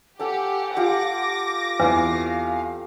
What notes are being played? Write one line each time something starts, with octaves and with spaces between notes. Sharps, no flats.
G4 A4 F#5 G#5
F4 G4 D6 A#6
E2 C4 F5